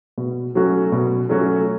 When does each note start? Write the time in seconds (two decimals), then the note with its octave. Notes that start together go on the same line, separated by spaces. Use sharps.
0.18 B2
0.55 F#3 A3 C#4 F#4
0.92 B2
1.29 F#3 A3 C#4 F#4